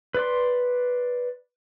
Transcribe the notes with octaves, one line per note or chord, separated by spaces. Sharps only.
B4 D5 C6